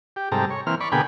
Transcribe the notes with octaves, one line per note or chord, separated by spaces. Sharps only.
G4
G#2 C3 G3 A4 A#5
C#5
E3 A#3 C4 F6
D5 B5 C#6
B2 D3 A#3 G#4 G5 B5